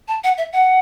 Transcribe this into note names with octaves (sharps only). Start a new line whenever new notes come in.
A5
F#5
E5
F#5